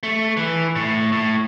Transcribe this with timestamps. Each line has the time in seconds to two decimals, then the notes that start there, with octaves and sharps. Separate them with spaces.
0.03 A3
0.37 E3
0.76 A2
1.12 A2